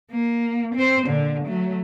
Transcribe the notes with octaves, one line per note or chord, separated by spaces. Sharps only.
A#3
C4 C5
A#2 D3
F#3 A3